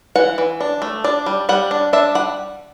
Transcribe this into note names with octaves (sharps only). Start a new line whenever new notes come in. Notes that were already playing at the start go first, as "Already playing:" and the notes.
E3 F#5
E3
D4
A3
D4 D5
G3
G3 F#5
D4
D4 E5
G3 F#5